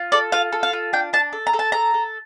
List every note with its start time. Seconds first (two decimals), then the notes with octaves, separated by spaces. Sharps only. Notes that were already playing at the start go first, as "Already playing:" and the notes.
Already playing: F4
0.12 A4 D5
0.32 F4 F5
0.52 A4
0.63 F5
0.73 F4
0.93 D4 G5
1.13 D4 A5
1.33 A4
1.47 A#5
1.53 A4
1.59 A5
1.72 A4 A#5
1.94 A4